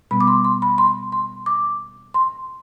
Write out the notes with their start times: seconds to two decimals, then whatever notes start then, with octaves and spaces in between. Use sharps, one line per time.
0.11 B2 G3 B3 B5
0.21 D6
0.28 C6
0.44 C6
0.62 B5
0.78 C6
1.12 C6
1.46 D6
2.14 C6